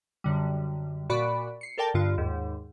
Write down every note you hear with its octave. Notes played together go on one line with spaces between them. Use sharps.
F#2 D3 G3
A#2 F#4 D5 B5 C#6
C7 C#7
A4 A#4 D5 G5 A5
G2 D3 F4
D#2 G#2